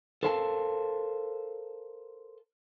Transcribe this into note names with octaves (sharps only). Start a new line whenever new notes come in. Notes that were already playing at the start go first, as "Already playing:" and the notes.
A4 A#4 C5 F5 G5 A5